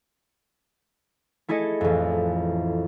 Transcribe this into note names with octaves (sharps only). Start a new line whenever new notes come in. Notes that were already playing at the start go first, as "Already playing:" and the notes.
A3 E4 G#4 A4 D#5 C#7
A1 F2